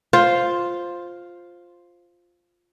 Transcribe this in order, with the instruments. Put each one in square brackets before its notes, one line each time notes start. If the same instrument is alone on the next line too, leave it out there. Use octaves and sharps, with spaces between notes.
[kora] F4 C5